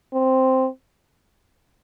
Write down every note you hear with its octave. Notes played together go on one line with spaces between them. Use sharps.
C4